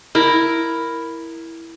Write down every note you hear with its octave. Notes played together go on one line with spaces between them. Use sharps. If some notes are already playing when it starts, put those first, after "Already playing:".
E4 A#4